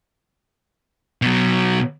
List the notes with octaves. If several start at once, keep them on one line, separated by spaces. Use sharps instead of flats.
B2 F#3